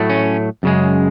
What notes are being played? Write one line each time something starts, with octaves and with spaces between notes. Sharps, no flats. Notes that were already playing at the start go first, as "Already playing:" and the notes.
Already playing: A2 F#3 A3
C#4
F#2 C#3 G#3